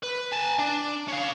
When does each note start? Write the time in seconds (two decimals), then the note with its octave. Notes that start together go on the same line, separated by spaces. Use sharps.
0.03 B4
0.33 G#5 A5
0.59 D4
1.08 C#4 F5